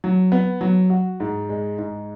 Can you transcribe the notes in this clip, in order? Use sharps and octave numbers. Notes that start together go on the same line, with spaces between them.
F#3
B3
F#3
F#4
G#2
G#3
G#2